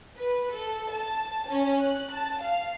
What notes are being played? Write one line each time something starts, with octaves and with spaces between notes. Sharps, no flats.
B4
A4
A5
C#4
F#6
A5
F5